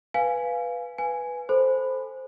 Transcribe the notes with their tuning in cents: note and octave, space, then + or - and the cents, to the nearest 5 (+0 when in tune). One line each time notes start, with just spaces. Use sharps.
B4 +0 F5 +0 G#5 +0
B4 +0 G#5 +0
A4 +0 C5 +0 B5 +10